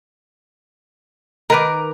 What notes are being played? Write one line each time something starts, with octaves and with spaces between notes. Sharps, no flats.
D#3 A#4 B4 D6